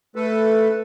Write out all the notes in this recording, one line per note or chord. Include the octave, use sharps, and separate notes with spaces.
A3 A4 B4